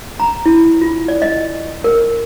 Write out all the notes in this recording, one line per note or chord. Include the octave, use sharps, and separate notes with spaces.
A#5
E4
F4
D5
D#5
A#4